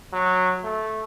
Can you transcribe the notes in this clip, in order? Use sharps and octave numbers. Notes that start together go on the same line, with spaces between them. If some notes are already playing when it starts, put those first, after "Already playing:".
F#3
A3